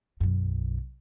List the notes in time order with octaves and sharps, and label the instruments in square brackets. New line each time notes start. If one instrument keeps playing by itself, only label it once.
[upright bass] B1 F#2